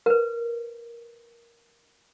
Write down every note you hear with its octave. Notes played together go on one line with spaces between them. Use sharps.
A#4 B4